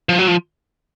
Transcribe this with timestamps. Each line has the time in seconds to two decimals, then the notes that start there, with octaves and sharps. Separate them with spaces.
0.09 F3
0.19 F#3
0.28 F3